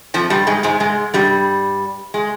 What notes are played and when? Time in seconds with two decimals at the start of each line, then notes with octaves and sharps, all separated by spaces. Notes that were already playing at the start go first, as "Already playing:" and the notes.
0.14 F2 F3
0.30 G2 G3
0.47 G#2 G#3
0.63 G#2 G#3
0.80 G#2 G#3
1.14 G2 G3
2.14 G#3